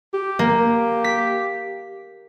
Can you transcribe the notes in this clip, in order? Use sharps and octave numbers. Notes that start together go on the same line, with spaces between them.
G4
A#3
B6